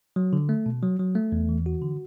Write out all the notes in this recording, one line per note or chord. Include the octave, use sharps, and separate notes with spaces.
F#3
D3
A3
B2
F#3
F#3
A3
E2
E3
F#4
D3